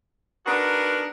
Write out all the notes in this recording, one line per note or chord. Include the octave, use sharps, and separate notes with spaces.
B3 D4 D#4 F#4 G#4 A#4